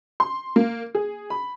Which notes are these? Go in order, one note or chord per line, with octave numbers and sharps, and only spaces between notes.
C6
A#3
G#4
B5